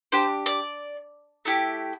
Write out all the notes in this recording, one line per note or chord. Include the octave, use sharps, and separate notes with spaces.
D4 G4 C5
D5
A3 E4 G4